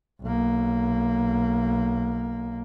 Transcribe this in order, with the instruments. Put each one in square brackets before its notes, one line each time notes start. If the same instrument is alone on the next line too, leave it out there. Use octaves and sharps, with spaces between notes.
[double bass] B1 A#3